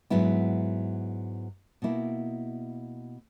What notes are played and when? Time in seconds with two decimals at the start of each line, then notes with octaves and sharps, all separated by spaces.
0.10 G#2 F#3 B3 E4
1.82 B2 A#3 E4